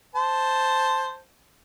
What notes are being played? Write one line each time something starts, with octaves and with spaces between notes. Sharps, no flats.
C5 A5